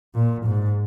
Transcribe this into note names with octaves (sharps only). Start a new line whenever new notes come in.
A#2
G#2